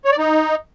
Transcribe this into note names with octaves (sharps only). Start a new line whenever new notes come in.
C#5
D5
D#4